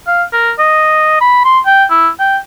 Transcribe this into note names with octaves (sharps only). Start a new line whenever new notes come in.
F5
A#4
D#5
B5
C6
G5
E4
G5